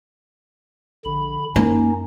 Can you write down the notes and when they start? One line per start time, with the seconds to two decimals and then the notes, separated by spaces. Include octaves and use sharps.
1.05 A#1 D3 B5
1.56 F#2 A#3 C#4 D#4